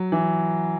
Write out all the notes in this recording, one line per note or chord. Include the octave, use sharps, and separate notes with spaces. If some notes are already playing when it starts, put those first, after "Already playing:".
Already playing: F#3
E3